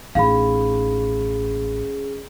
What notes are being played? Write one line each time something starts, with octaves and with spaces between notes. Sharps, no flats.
A1 C#4 D#4 G#4 F5 B5